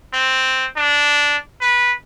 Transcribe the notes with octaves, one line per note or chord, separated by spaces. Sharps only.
C4
D4
B4